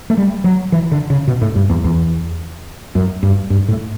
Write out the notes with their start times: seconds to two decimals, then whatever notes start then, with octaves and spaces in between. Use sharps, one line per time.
0.10 A3
0.17 G3
0.44 F#3
0.72 E3
0.92 D3
1.10 C#3
1.28 B2
1.42 A2
1.56 G2
1.70 E2
1.84 E2
2.95 F#2
3.23 G2
3.50 G2
3.68 A2